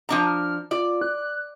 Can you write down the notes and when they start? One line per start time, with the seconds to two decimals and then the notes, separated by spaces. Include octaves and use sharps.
0.09 F3 D4 A#5
0.26 F6
0.71 F4 D5
1.02 F#6